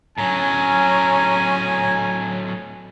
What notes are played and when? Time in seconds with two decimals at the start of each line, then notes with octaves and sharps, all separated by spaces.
0.18 A2 F#3 C#4 G#5 A#5